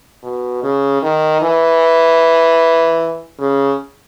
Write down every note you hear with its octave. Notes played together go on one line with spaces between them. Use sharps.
B2
C#3
D#3
E3
C#3